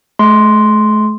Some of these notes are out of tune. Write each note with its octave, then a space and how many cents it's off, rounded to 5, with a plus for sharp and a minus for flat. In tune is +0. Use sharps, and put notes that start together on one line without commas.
A3 -45 C6 +0